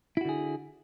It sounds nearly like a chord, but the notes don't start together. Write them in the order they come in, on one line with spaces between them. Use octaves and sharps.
E4 F#4 D3 G#4